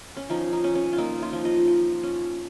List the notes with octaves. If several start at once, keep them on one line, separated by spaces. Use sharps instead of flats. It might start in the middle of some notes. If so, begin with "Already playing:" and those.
C#4
F3 D#4
D#4
C#4
C#4
F4
A#3 D#4
F4
F3
D#5
F3
C#4